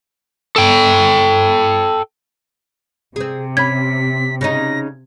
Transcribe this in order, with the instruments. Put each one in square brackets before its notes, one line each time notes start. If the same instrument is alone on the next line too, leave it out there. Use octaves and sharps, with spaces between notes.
[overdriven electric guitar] A4 G5
[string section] C3 [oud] C4 G#4
[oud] C#4 [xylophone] B5 G#6 [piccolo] B6
[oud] C#3 C#4 D#4 [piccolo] A#6